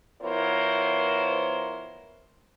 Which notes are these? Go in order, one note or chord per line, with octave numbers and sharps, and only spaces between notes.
F3 B3 E4 A#4 C5 C#5